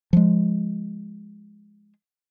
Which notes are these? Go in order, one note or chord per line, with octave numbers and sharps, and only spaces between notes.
F3 G#3